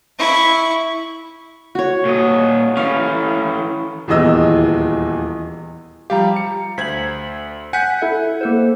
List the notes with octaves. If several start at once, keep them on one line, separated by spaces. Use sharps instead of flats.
E4 C#6
F#4 C#5
A#2 D#5
E3 C#4 F5
D#1 E2 E3 D#5 E6
F3 G3 G4 F5 A#5
C#7
D2 C5 G#6 B6 F#7
F#5 G#5 F#6 G6 B6 C#7
E4 A4 E5
A#3 A4 C5